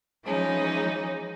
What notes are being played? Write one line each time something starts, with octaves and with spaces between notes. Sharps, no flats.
E3 F3 G#3 C#4 D#4